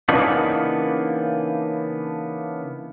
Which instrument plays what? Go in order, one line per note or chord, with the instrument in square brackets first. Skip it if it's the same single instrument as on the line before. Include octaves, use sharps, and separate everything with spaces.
[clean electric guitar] C#3 E3 A#3 B3 D4 D#4